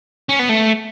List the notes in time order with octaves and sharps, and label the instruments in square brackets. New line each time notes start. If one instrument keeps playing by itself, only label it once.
[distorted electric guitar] C#4
B3
A3